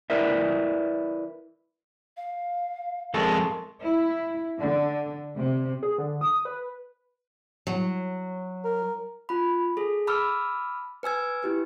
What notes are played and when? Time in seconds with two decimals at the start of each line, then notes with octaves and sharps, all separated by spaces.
0.10 E4 A#4 B4 D5 E5
2.17 F5
3.14 F2 G#3 A4 A#4 C6 C#6
3.84 E4
4.58 D3
5.36 C3
5.83 G#4
5.98 D3
6.21 D#6
6.45 B4
7.67 F#3
8.64 A#4
9.29 F4 B5
9.77 G#4 A4
10.07 A5 B5 D6 E6 F6
11.03 B4 G#5 E6 G#6
11.43 E4 G4 B4